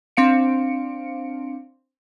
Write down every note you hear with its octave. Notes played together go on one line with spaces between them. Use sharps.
C4 D4 F5 C#7 D7